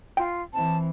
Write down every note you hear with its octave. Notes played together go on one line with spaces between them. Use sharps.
F4 G5
E3 C4 A5